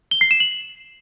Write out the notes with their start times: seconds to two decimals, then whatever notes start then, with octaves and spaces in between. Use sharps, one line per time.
0.11 G7
0.21 C7
0.31 E7
0.40 F#7